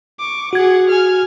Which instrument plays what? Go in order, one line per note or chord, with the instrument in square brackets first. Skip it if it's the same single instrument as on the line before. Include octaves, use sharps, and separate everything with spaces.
[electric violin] C#6 D6
[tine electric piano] F#4 G#6 [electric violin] G#4 F#5
[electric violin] G#5 F6